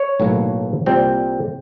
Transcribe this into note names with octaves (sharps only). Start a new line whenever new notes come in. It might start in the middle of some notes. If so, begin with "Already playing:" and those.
Already playing: C#5
B1 A2 F#3 A#3
C2 A#2 G3 C4